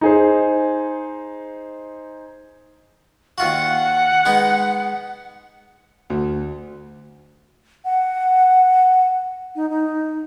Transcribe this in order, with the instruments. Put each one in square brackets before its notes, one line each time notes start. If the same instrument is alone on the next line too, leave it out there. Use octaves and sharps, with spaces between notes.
[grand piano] D#4 G#4 C5
[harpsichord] D#2 F4 F#4 [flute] F#5
[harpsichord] G#3 B3 D#4
[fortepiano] D2
[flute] F#5
D#4
D#4